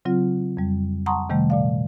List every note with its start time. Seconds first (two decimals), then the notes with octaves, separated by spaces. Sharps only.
0.05 C#3 F#3 C4 F4
0.57 F2 G3
1.06 F#5 A5 A#5 C6 C#6 D#6
1.30 C3 D#3 G3 A3
1.50 A#2 D5 F5